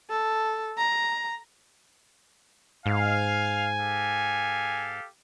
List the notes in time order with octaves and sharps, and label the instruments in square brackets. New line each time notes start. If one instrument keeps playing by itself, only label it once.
[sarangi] A4
A#5
[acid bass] G#2 [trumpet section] F5 [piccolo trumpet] G#5
[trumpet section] G4 A4 F5